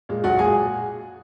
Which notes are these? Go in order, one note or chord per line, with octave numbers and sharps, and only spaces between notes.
A#2 G#3
B1 F#4 F#5
A#2 G#3 G#4 G#5